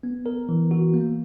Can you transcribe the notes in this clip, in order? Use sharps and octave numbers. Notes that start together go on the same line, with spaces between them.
B3
A#4
E3
F#4
A#3